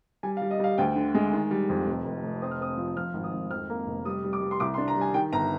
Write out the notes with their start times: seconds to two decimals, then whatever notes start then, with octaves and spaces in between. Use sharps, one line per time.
0.23 G3 G#5
0.37 F5
0.42 G3
0.51 D#5
0.60 G3 F5
0.78 D2 G5
0.96 D3
1.15 G#3
1.32 D#3
1.51 G3
1.69 F2
1.87 F1
2.05 F1
2.24 F1
2.42 C4 D#6
2.51 F6
2.61 C4 D#6
2.78 F3
2.97 F3 F6
3.14 G#1
3.24 D#6
3.33 G#1
3.50 F2 F6
3.70 A#3
3.87 F1
4.05 G3 D#6
4.24 G3
4.33 D6
4.41 G3
4.51 C6
4.60 C2 D6
4.74 C6
4.78 D4
4.88 A#5
4.96 G3
5.01 G#5
5.14 D#3 G5
5.33 G1 A#5